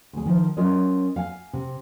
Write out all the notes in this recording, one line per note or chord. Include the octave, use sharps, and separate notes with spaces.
D2 G#4
D#3 F3
F#3 C#4 F4 A#4 C#5 D#5
F5 F#5 G#5
C3